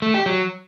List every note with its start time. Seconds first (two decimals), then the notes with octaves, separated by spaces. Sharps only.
0.02 A3
0.14 G4
0.26 F#3